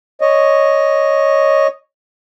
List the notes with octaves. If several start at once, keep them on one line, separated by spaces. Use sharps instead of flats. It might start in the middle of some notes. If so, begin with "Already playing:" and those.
C#5 D#5